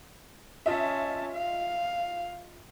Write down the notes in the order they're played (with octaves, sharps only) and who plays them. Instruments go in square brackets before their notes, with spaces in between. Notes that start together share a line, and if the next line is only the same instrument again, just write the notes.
[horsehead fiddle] C#4 A5 [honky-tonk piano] F4 D#5 E5
[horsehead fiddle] F5